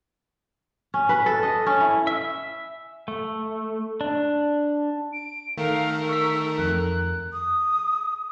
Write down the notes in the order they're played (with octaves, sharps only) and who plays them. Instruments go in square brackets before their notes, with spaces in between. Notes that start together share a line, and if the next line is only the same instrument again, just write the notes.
[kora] C#4
B4
A4
D#5
C#4
E4
[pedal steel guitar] E5
A3
D4
[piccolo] D7
[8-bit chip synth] D#3 A3 [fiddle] A#4 [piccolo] F5
[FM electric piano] C#6 B6 [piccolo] E6
[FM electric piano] F2 [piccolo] F#6
[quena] D#6